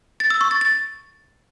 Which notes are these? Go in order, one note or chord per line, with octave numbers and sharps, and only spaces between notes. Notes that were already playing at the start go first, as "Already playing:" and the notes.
A6
E6
C#6
A6
A6